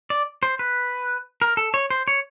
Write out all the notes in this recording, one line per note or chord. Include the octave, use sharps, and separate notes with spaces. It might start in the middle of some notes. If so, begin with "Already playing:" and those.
D5
C5
B4
A#4
A4
C#5
C5
C#5